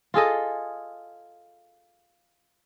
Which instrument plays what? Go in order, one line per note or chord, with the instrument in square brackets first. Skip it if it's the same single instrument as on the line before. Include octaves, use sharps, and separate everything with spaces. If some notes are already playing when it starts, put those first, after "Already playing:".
[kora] F4 G#4 A4 D#5